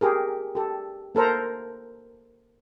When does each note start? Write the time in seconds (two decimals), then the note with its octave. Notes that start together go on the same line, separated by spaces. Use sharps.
0.01 G4 G#4 A#4
0.55 G4 A4
1.15 A#3 A4 A#4 C5 A#5